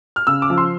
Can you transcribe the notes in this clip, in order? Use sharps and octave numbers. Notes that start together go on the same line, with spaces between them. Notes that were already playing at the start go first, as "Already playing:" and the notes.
F6
C#3 E6
D6
F3
C6